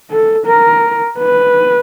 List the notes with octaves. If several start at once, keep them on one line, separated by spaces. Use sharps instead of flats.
A4
A#4
B4